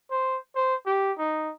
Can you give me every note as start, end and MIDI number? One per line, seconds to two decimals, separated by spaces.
0.11 0.38 72
0.55 0.75 72
0.86 1.12 67
1.18 1.52 63